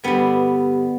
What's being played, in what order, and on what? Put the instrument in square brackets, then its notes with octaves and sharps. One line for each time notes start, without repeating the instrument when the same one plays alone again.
[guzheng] G2 D3 G3 B3